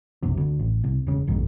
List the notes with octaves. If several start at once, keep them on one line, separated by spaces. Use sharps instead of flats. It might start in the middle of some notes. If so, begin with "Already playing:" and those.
F#1 B1 F#2 C3
D2
A1
C2
E1 C#3
F1 A#1 G#2 D#3